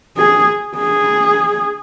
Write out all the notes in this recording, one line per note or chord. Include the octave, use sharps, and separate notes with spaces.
G#4
G#4